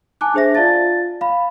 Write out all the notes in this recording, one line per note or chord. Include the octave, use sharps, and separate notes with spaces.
G#5 A5 D6 F#6
D4 G#4 C5 E5 A#6
F4 D5 F5 A5 A6
F5 B5